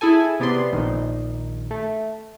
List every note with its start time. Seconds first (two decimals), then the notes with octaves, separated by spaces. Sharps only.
0.01 E4 G#4 A4 G#5
0.40 C3 B3 D5 C6
0.72 A#1 D#3
1.71 A3